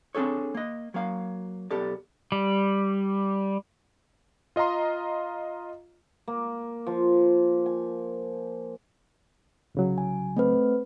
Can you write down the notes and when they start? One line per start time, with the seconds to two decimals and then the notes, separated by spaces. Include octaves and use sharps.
0.15 C4 D4 G#4 A4 C#5
0.55 A#3 D#5
0.94 F#3 A#3 F5
1.71 B1 B3 G4 A4 D5
2.32 G3
4.56 F4 D#5 F5 A#5 C6
6.28 A#3
6.87 F3
7.66 G#5
9.75 C2 C#3 F#3
9.98 G#5
10.37 A3 C4 B4